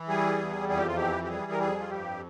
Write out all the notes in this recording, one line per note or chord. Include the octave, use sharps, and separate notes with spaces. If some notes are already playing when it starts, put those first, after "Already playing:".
Already playing: E3
G3 G#4
E2
F2 G#4
G4
F4
E3 G4
G4
G3 G#4
A#4
F2 G#4
F4
G2 G4